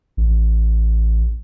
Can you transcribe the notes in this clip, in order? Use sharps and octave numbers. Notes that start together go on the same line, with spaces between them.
A1